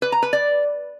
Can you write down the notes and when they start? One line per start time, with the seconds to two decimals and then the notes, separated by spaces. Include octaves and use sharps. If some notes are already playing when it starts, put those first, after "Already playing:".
0.02 B4
0.12 A#5
0.23 B4
0.33 D5